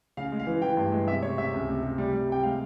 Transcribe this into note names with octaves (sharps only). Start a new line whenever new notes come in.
C#3 F5
G#3
F5
E3
E3 G5
G2
G#3
C3 E5
C3 C#5
C3 E5
C#2
C3
C3
G3
G3
C3 G5
G#3 F5